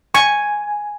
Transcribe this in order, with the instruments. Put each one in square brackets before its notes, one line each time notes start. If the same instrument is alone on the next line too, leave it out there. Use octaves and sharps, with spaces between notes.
[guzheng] G#5 [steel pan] C#6